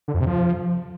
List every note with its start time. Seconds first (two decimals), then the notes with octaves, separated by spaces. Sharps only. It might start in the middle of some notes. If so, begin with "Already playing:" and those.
0.08 D3
0.14 F2
0.20 C3
0.27 F3